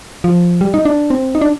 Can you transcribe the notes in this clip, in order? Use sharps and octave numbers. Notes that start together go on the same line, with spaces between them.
F3
G3
D#4
D4
C4
D#4
D4